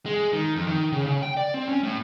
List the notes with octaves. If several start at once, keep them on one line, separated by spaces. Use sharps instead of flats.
G#3
D#3
F2
D#3
C#3
C#3
G5
D5
C4
C#4
A2